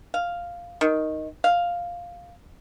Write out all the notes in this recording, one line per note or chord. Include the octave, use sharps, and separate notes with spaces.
F5
D#3
F5